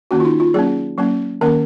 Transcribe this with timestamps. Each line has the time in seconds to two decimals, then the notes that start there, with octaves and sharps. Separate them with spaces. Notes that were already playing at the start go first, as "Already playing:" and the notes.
0.11 D#3 A#3 C#4 F#4
0.20 F4
0.25 D#4
0.40 F4
0.54 F#3 A#3 C#4 G#4
0.98 F#3 A#3 C#4
1.41 D#3 A#3 C#4 A#4